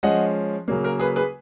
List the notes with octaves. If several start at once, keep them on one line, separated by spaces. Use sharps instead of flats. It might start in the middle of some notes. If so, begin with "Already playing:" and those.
F3 G#3 C#4 D#5 F#5
C#3 F#3 A#3
A#4
G#4 B4
G#4 B4